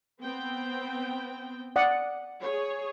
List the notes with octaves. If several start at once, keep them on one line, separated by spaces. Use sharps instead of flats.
B3 C4 G5
D5 F#5 D#6
G#4 C#5